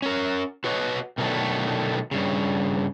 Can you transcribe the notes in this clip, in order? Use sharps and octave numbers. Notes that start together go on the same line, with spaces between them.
C#4 A#4
F#4 B4 C#5 D#5
B2 D3 D#3 F#3 A3
G2 C#3